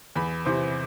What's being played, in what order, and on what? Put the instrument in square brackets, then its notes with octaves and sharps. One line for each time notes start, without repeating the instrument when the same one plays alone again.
[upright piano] E2 B5
C3 E3 C5